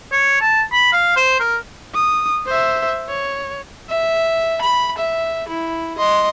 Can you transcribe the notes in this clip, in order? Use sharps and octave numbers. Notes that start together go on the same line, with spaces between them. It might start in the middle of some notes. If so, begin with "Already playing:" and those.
C#5
A5
B5
F5
C5
A#4
D#6
C5 E5
C#5
E5
B5
E5
E4
D#5 C6